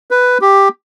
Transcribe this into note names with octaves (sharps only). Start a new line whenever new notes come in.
B4
G4